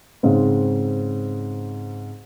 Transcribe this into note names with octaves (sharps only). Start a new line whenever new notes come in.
G#2 C#3 C4